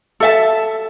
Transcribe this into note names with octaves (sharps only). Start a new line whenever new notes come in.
A4 E5 A5